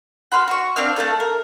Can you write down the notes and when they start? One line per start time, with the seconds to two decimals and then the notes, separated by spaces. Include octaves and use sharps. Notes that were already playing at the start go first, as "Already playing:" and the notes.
0.32 F#4 B5 C6 F6
0.48 F#4 C#6
0.76 C4 D4 F5 F6
0.96 A3 C#4 A4 F5
1.20 A#4